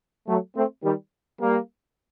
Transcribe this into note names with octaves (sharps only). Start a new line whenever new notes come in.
F#3 A3
A3 C4
D#3 G3
G3 A#3